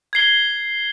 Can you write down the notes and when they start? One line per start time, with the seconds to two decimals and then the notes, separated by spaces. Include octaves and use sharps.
0.13 G#6 C7 G7